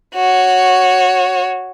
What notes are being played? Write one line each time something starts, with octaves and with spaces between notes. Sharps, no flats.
F#4 C#5